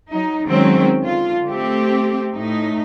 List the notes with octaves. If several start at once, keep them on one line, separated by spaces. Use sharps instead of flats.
F#3 D#4
D#3 F#3 G#3 C4 C#4
D3 F4
A3 C4 G4
A2 D#4